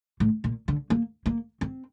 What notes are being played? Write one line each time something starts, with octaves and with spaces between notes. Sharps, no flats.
A2
A#2
D3
A#3
A#3
C4